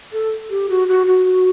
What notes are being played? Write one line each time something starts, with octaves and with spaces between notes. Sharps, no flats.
A4
G4
F#4
F#4
F#4